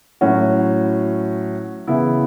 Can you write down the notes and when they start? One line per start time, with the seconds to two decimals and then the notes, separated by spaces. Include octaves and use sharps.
0.21 A2 F#3 C#4 F#4
1.87 C#3 E3 B3 E4